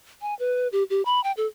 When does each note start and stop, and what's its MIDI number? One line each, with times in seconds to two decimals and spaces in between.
0.21 0.34 80
0.39 0.68 71
0.72 0.83 67
0.90 1.04 67
1.05 1.22 83
1.24 1.32 79
1.37 1.46 69